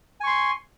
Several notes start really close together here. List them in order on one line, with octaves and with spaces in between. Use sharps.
G#5 C#6 C6